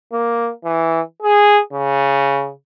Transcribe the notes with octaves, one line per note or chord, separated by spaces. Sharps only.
A#3
E3
G#4
C#3